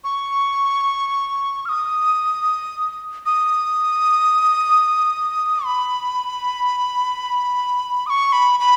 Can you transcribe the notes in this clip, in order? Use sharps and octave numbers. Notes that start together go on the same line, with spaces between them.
C#6
F6
D#6
D#6
B5
D#6
C#6
B5
B5